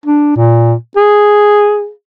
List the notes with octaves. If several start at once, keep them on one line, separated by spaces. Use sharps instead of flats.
D4
A#2
G#4